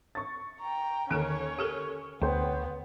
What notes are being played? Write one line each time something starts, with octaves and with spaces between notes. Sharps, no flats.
C#6 A6
G5 A#5
D#2 D3 C#4 A4 C#5 D7
G4 A4 A#4 C#6
D2 B3 C5 C#5 G5